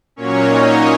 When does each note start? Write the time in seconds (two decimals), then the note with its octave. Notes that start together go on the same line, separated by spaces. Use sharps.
0.16 A#2 F#3 A#3 C#4 C#5
0.47 D#4 D#5